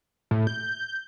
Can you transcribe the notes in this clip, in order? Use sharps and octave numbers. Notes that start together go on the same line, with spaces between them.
A2
G6